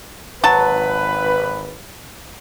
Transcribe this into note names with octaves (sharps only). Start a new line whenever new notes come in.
G#1 F#3 B4 A5